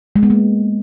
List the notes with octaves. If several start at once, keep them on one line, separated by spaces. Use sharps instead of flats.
G#3
B3
A#3